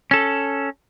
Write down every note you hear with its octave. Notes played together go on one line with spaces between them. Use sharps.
C#4 A4